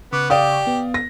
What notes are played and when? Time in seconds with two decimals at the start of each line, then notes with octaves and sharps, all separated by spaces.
0.13 C#3 B3 C#6 D6
0.30 G4 D5 F5 D#6
0.67 B3
0.94 A#6